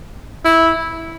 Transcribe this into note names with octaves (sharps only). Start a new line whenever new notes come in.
E4